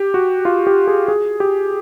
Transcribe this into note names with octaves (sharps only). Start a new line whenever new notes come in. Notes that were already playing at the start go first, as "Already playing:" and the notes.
Already playing: G4
F#4
F4
G4
G#4
G#4
G4